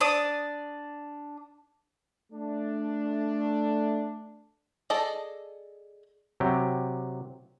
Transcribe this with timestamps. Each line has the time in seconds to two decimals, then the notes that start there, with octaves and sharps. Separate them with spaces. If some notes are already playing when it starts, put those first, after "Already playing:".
0.01 D4 D5 D#6
2.33 A3 D4
4.90 G#4 A4 D5 D#5 A5
6.40 C3 F#3 G4